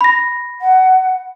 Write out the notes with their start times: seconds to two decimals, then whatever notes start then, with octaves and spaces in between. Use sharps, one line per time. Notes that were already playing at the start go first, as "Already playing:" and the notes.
0.01 B5 A#6
0.61 F#5